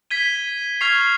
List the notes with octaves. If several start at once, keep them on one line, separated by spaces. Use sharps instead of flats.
G#6 B6 D#7 G7
C#6 F6 G#6 C7 F7